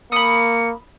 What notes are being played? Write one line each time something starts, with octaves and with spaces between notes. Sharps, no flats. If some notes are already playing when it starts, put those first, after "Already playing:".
A#3 B5 D#6 C#7